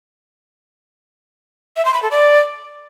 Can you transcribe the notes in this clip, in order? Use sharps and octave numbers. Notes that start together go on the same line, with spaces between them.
E5
C6
B5
A4
D5